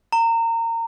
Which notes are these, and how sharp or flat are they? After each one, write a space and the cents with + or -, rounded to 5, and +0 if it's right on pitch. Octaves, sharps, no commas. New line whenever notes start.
A#5 -25